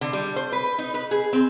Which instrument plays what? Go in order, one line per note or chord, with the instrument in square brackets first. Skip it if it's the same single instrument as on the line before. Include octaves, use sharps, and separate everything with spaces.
[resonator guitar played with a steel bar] D3
G3
C5
B4
D#4
B4
G#4
C4